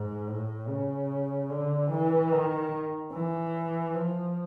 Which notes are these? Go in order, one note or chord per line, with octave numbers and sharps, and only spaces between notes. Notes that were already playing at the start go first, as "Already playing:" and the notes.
Already playing: G#2
A2
C#3
D3
E3
D#3
E3
F3